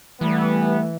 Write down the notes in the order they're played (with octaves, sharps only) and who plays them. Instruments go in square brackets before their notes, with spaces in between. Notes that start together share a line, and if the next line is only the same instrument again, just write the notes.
[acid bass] E3 [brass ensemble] G3 B3 [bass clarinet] A3